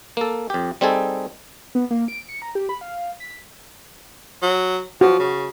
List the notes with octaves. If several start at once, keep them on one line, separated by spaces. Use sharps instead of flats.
A#3 A4
F2 G4
G3 C4 D#4 G#4 A4
B3
A#3
D7
C#7
A#5
G4
B5
F5
B6
F#3
F3 F#4
C#3